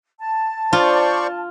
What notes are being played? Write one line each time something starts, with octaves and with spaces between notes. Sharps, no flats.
A5
F4 C5 D5 C#6